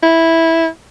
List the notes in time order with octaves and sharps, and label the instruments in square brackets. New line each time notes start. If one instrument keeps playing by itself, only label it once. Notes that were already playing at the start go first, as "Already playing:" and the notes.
[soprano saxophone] E4